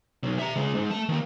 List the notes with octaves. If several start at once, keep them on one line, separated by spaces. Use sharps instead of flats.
B1
E5 A#5
C#3 G#3
G#2
A3 A5
D#3 A#3